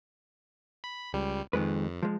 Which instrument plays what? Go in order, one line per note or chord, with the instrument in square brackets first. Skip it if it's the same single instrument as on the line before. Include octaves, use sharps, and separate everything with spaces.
[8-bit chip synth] B5
C#2 G3
[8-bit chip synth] F2 [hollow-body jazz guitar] D#3 G#3 B4
[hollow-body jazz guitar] F3 G#3